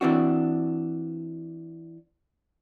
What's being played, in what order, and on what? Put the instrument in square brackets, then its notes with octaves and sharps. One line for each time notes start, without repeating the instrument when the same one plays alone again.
[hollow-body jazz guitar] E3 C4 D4 F#4